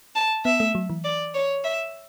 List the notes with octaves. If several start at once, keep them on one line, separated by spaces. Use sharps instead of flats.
A5
B3 E5
A3
F#3
E3
D5
C#5
E5